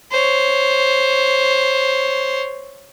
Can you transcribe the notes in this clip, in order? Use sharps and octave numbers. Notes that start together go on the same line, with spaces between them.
C5 C#5